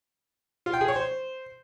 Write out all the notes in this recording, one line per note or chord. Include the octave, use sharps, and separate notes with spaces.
F4
G5
G#4
C#5
C5